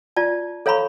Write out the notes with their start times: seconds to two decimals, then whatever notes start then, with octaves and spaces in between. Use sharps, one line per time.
0.16 F4 D5 A5
0.66 A4 C#5 F5 A#5 B5 C#6